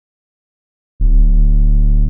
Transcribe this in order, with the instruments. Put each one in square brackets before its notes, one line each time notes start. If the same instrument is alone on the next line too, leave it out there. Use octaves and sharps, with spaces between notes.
[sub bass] D1